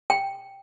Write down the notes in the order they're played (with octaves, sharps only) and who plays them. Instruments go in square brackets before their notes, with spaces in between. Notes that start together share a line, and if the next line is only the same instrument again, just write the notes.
[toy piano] G5